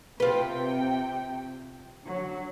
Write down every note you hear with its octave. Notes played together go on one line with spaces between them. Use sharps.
C3 F4 B4 G5
D3 F#3